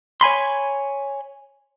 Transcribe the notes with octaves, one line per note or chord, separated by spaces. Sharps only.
C#5 G#5 B5 C6